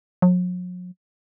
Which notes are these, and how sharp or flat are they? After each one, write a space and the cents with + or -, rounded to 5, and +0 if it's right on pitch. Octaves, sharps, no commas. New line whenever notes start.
F#3 -45